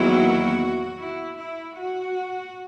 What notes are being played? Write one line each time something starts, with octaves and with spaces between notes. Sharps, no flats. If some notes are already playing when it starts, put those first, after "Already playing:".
Already playing: E2 D#3 F#3 A#3 E4 F#4
E4
E4
F#4